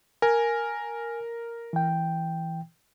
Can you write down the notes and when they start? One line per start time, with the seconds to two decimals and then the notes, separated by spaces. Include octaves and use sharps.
0.22 A#4 G#5
1.73 E3 G5